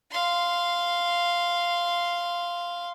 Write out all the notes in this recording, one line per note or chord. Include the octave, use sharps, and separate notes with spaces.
F5 C6